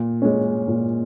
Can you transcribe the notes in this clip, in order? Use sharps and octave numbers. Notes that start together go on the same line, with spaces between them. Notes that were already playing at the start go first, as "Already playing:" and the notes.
Already playing: A#2
G#3 C#4
A#2